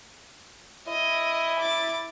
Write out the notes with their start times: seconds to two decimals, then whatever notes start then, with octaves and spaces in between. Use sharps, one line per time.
0.89 E4 D#5
1.60 D6 A6